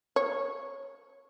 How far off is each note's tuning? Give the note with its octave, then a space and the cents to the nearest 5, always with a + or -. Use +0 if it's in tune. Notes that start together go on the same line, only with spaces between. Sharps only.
C#5 -10